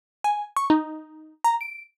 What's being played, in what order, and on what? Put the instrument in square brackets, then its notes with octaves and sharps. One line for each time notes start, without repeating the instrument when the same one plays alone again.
[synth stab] G#5
C#6
D#4
A#5
D7